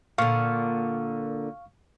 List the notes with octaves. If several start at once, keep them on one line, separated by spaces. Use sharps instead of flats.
A#2 D3 F5 C#6 F6